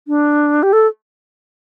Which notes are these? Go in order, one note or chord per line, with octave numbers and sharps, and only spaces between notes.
D4
G4
A4